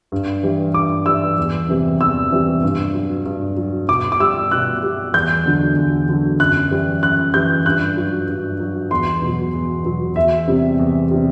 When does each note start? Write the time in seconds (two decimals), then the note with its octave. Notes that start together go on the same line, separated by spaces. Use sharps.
0.12 G2
0.43 E3 G3
0.74 G2 D6
1.06 E3 G3 E6
1.38 E2
1.69 C3 E3 G3
2.01 E2 E6
2.31 C3 E3 G3
2.63 G2
2.94 F#3
3.25 G2
3.57 F#3
3.88 B2 D6
4.12 D6
4.20 G3 E6
4.51 B2 F#6
4.83 G3
5.14 E2 G6
5.46 D3 F#3
5.77 E2
6.09 D3 F#3
6.40 F#2 F#6
6.71 E3 G3
7.02 F#2 F#6
7.34 E3 G3 G6
7.65 G2 F#6
7.97 F#3
8.28 G2
8.60 F#3
8.91 E2 C6
9.22 B2
9.27 F#3
9.53 E2
9.85 B2 F#3
10.16 E2 E5
10.47 C3 G3
10.79 E2
11.11 C3 G3